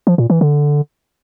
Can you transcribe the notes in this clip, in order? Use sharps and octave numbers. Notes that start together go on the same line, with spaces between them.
F3
A#2
E3
D3